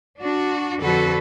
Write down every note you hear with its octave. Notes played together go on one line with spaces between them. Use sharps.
D4 F#4
F2 D3 F#4 A4 B4